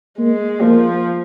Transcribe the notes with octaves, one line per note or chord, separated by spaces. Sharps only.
G#3 A#3
F3 A#3